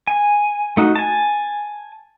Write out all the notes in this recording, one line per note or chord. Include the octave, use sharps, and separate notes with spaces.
G#5
A3 D#4 F#4
G#5 A5